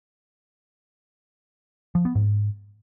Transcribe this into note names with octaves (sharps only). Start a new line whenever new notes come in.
F3
B3
G#2